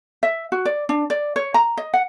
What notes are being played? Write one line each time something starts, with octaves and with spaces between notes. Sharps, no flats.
E5
F#4
D5
D4
D5
C#5
A#5
D#5
F#5